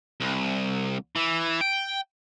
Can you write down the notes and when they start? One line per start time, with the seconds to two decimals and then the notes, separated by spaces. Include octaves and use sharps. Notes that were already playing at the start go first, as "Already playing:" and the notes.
0.21 C2
1.16 E3
1.61 G5